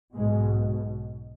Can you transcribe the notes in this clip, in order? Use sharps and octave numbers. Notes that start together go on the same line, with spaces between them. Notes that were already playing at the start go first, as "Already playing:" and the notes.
B1 G#2 B2 G#3